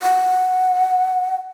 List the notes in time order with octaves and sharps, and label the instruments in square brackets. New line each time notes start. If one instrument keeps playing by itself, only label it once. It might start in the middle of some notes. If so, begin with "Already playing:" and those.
[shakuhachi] F#5